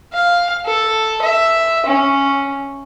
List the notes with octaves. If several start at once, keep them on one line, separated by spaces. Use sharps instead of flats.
F5
A4
E5
C#4